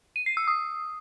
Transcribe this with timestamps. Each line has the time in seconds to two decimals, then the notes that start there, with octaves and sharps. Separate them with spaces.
0.16 D#7
0.26 C7
0.37 E6
0.48 D#6